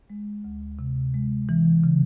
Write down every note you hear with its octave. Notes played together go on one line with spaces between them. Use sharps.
G#3
D2
C3
G#3
E3
C#3